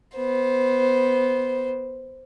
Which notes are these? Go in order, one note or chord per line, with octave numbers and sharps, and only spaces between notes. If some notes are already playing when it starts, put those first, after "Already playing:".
B3 C5